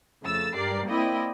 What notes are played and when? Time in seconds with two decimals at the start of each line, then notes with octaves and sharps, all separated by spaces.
0.23 F2 C#3 A3 E6 A6
0.55 G2 G4 A#4 D5 C7
0.87 A#3 C4 E4 D5 D#5 G5